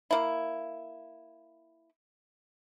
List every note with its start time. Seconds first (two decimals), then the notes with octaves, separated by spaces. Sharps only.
0.11 A#3 E4